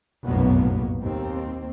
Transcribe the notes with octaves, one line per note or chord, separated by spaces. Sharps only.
F1 B1 F#2 A2 A#3 B3
D#2 C4